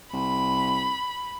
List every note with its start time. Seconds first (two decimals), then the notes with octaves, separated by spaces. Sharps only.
0.13 C2 B5